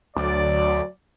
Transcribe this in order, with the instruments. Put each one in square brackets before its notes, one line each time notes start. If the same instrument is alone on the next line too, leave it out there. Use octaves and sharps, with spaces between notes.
[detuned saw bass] D2 [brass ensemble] F#3 D5